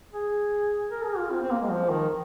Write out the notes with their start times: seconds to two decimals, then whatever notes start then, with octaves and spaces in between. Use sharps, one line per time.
0.13 G#4
0.91 A#4
1.05 G#4
1.18 F4
1.31 C4
1.42 C4
1.51 A#3
1.61 G#3
1.70 F3
1.90 D#3